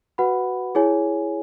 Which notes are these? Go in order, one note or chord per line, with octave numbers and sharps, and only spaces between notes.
F#4 B4 F#5 B5
E4 G#4 C#5 G#5